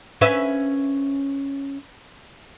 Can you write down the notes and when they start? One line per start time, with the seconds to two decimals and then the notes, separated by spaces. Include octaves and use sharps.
0.21 C#4 B4 E5